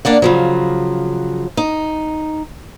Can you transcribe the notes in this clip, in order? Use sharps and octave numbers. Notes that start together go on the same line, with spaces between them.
A#3 D4 D5 F#5
C#3 F3 F#3
D#4